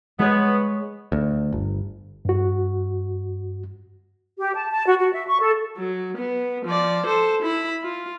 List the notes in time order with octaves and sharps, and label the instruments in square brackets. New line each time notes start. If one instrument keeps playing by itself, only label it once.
[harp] G#3 G#4 C#5 [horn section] B3
[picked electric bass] D2
G1
[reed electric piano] G2 F#4
[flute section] G4
A5
A5
F#4
F#4
E5
C#6
A4
[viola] F#3
B3
F3 D5
A4 C5
E4 B5
F4